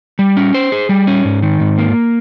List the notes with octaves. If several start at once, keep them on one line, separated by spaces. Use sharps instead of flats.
G3
C#4
C5
G#4
G3
C#4
G#2
D#3
G#2
A#3